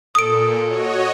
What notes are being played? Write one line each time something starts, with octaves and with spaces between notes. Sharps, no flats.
A#2 A4 D#6 D7
F#4 C#5 D#5